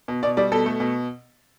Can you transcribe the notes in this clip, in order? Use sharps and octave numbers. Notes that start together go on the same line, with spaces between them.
B2
B2 D5
G3 D5
B2 A4
A3
B2